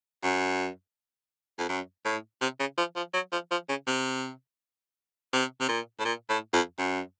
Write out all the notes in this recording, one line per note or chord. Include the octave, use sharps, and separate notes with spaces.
F#2
F2
F#2
A2
C3
C#3
F3
F3
F#3
F3
F3
C#3
C3
C3
C3
A#2
A2
A#2
A2
F2
F#2